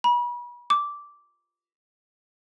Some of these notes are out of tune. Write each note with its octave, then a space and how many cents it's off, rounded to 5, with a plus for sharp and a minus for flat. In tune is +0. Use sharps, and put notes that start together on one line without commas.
B5 -35
D6 -10